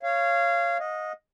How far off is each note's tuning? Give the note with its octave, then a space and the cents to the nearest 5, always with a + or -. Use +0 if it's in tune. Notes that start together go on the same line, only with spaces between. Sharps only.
C#5 +0 F5 -20
D#5 +0 F#5 -45